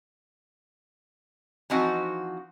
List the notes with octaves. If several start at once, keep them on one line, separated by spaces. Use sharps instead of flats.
E3 F3 C4 D#4 F#4